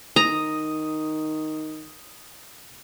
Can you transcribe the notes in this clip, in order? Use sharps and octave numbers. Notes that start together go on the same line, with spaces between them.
D#3 A#5 D#6